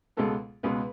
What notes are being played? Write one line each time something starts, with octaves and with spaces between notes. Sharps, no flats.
C#2 B2 G#3 B3 A4
C#2 B2 G#3 B3 B4